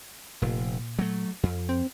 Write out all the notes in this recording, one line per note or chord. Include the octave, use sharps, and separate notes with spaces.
F1 A#2
F#3 A3
F2
C4